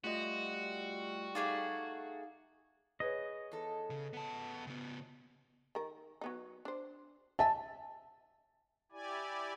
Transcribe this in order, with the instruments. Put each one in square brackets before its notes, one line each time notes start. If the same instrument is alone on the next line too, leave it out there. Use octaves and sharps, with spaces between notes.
[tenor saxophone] G3 [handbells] A3 F4 D#5 [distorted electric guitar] F#4
[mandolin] A3 G#4 D6 [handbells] D#4 F5 A6
[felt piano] G#4 B4 C#5 [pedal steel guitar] D#5
[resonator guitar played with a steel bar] E2 A4
[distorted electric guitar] C#3
B3 A5
C#3 B3
[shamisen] D#3 A#4
F#3 B3 D#4
D4 C5
[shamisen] D#5 E5 G#5 [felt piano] A5
[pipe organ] E4 G4 D5 G#5